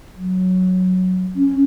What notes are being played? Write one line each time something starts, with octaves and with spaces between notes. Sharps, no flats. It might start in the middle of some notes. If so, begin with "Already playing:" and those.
F#3
C#4